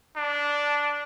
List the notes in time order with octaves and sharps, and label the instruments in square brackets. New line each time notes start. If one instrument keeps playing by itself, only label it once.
[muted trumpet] D4